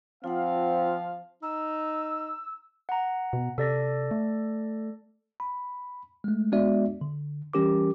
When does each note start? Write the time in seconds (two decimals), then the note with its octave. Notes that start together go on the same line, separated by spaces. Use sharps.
0.24 F3 C4 F4 F5 F#5
1.43 D#4 E6
2.89 F#5 A#5
3.33 B2
3.58 C3 A4 D5 A#6
4.11 A3
5.40 B5
6.24 G#3 A3
6.52 G#3 B3 D4 F#4 D5 E5
7.01 D3
7.53 E3 G3 C#4 G4 A#4 D6